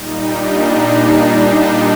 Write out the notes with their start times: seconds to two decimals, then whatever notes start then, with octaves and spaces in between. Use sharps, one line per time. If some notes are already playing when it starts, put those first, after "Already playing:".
Already playing: A#2 G3 D#4
0.20 D4